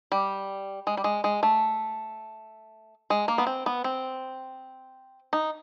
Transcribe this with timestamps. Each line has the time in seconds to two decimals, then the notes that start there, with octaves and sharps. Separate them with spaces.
0.12 G3
0.87 G#3
0.97 G3
1.04 G#3
1.24 G#3
1.43 A3
3.10 G#3
3.28 A#3
3.38 B3
3.47 C4
3.66 B3
3.84 C4
5.33 D#4